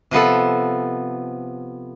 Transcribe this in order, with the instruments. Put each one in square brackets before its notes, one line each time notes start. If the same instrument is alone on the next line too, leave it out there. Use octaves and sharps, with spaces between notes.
[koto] C3 F3 B3 A4